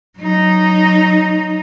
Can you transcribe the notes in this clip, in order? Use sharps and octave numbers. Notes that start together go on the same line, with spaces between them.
F#3 D#4